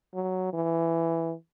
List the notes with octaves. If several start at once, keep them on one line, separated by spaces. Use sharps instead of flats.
F#3
E3